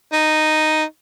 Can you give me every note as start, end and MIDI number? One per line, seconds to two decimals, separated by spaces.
0.12 0.84 63